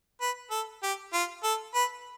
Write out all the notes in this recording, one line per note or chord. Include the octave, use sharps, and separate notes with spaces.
B4
A4
G4
F4
A4
B4